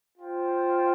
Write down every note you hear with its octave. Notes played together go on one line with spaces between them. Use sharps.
F4 C5 G5